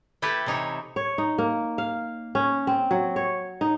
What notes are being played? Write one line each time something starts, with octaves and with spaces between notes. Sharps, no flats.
A3 E4 G4 A4 B4
C3 E3 D#4 E4 C#5
C#5
D#4
A#3
F5
C#4
C4
F#3
C#5
D#4